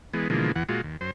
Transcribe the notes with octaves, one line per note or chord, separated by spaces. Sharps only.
E3 G#3 B3
B2 D3 E3 F3 G#3 A#3
E2 E3 F#5
A#2 G#3 F4 F#4
D#2
F#2 C5